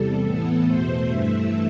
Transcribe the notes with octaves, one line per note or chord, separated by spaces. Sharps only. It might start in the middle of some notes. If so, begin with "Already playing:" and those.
Already playing: E2 C3 G3 A4
A2 E3 B3
E2 B2 A3 C5
G2 E3 A3 E5